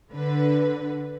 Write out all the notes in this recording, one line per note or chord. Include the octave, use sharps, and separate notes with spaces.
D3 B4